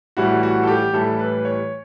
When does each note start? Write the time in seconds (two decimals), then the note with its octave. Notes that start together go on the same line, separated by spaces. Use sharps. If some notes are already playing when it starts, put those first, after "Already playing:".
0.17 A2 E3 G3 F#4
0.43 F#4
0.63 A4
0.68 G4
0.93 A2 E3 G3 A4
1.19 B4
1.45 C#5